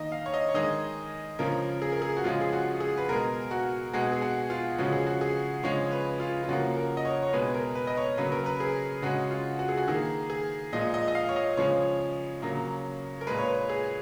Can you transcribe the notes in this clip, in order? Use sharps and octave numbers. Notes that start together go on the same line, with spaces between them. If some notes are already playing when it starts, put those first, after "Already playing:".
Already playing: D#3 A#3 D#5
F5
C#5
D#5
C#5
D#3 G#3 D#5
C#3 F3 G#3 A#4
G#4
A#4
G#4
F#4
C#3 F3 G#3 F4
G#4
F#4
G#4
B4
B2 G#3 A#4
F#4
B2 G#3 F#4
G#4
F#4
F4
C#3 F3 G#3 F#4
G#4
F#4
G#4
C#3 F3 G#3 C#5
B4
F4
F4
C#3 F3 A#3 F#4
A#4
D#5
C#5
C#5
B2 G#3 B4
A#4
B4
D#5
C#5
C#3 F#3 A#3 B4
A#4
B4
G#4
C#3 G#3 F#4
F4
F#4
G#4
F#4
D#3 A#3 G#4
G#4
A#2 F3 G#3 D#5
D#5
D#5
F5
C#5
D#5
C#3 F3 G#3 C#5
C#3 F#3 A#3
A#4
A#2 G#3 B4
C#5
B4
G#4